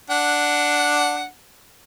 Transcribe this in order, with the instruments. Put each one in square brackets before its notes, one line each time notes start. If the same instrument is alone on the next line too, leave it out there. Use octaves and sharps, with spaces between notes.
[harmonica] D4 F#5